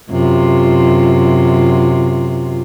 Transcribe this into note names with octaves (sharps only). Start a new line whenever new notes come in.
F#2 C3 F4